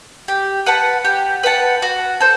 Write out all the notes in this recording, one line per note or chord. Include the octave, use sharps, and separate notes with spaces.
G4
B4 F#5 A5
G4
B4 F#5 A5
F#4
A4 C5